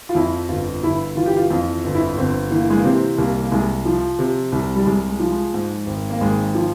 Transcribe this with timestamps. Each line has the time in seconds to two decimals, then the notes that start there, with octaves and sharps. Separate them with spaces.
0.09 F4
0.15 F2 E4
0.49 G1 F4
0.83 G1 E4
1.16 E3 F4
1.26 G4
1.37 F4
1.50 F2 F4
1.84 G1
1.95 E4
2.17 G1 C4
2.51 E3 A#3
2.70 G#3
2.77 A#3
2.84 C3 C4
3.18 C2 A#3
3.43 A#3
3.52 C2 G#3
3.85 F3
4.19 C3
4.52 C2
4.75 G3
4.86 C2 G#3
5.09 G#3
5.19 F3
5.31 G#3
5.54 G#2
5.87 G#1
6.10 A#3
6.21 G#1 G#3
6.55 F3